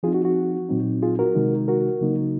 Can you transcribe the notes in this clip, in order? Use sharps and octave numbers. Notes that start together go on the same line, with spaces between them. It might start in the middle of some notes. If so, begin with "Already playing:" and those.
F3 C4 D#4 F4 G#4
F#4
F#4
A#2 F#3 C4 D#4
F4 G#4
F#4 A#4
C3 D#3 G#3 D#4
F#4 A#4
C#3 F#3 A#3 D#4